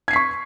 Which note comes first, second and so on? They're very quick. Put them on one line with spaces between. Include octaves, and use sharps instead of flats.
G#6 C7 B6 C#6